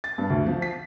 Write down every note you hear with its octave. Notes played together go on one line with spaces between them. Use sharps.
A6
G2
D2
F3
B6